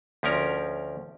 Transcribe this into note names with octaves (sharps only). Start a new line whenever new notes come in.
D2 F3 C#4 A#4